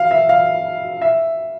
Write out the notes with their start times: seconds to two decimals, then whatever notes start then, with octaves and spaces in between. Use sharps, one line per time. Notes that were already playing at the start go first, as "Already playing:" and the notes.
Already playing: F5
0.11 E5
0.29 F5
1.02 E5